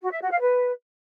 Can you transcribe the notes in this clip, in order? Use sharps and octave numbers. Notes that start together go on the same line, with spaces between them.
F#4
E5
F#4
F5
B4